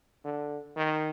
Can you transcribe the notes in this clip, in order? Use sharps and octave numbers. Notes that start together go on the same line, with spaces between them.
D3
D#3